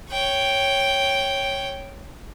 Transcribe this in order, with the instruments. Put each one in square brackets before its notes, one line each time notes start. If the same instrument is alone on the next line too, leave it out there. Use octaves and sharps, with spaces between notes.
[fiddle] C#5 G5